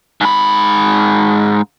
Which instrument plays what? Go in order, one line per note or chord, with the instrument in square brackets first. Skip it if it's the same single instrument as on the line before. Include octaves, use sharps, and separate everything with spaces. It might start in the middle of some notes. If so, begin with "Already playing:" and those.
[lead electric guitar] G#2 B5